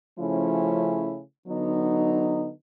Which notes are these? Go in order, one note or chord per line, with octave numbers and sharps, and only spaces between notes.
C#3 F3 A3 C#4 E4
D3 F#3 B3 D#4